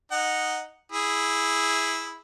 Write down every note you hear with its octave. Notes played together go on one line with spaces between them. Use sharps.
D#4 F#5
E4 G#4